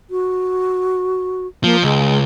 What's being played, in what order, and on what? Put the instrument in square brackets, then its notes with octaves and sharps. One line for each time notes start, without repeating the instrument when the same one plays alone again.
[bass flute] F#4
[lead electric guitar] F3 [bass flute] A#3
[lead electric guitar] C#2 [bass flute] G#3